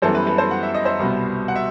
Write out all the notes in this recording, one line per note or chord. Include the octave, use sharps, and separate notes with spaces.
F#2 E3 G3 B3 A4 C5
B4
B4
A4 C5
F#5
E5
D#5
C5 E5
C2 B2 G3 B3
F#5
E5